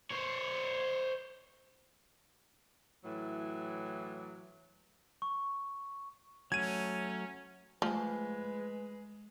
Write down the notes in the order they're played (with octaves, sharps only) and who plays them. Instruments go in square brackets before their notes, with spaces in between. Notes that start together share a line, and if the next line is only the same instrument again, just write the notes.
[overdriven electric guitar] C5 C#5
[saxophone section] A2 E3 F#3
[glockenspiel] C#6
[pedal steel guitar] F#3 A3 [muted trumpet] C#4 [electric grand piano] G#6 D#7
[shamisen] F3 [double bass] G#3 [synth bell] A3 G#5 [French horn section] B4